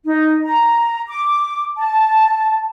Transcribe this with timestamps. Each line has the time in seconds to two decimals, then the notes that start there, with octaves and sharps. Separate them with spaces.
0.05 D#4
0.45 A#5
1.08 D6
1.77 A5